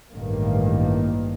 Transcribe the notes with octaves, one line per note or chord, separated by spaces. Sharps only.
A1 G2 D#3 A#3